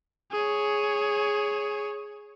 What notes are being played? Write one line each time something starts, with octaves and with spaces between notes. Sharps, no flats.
G#4 C#5